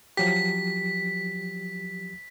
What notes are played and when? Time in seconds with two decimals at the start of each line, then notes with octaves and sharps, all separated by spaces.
0.17 F3 F#3 G4 B6